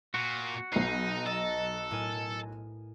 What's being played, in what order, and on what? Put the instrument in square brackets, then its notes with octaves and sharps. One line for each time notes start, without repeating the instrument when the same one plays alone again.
[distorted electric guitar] A#2 [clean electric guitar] F#4
[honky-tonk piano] B1 C7 [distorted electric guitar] D#4 [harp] B4
[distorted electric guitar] A4 [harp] D#5 A#5
[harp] A2 A#4 G#5